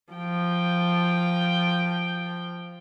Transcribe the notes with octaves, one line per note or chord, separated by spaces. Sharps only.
F3 G5